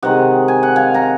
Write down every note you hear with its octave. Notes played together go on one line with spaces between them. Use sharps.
C3 D#3 G#3 D#5 F#5
G#5
F#5
F5 G#5
F#5 A#5